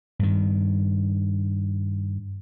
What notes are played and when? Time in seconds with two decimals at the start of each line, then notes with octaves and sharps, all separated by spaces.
0.19 G2 D#3